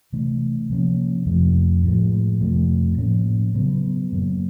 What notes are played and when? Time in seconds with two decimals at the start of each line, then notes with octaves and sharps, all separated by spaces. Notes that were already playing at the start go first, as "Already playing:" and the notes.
0.13 C3 E3 A3 D4
0.69 C3 F3 A#3 C#4
1.26 F2 C3 F3 A3
1.84 A2 F3 G#3
2.41 F2 C3 F3 A3
2.98 A2 F3 A#3 C#4
3.54 C#3 F#3 B3
4.12 F#2 D3 F#3 A#3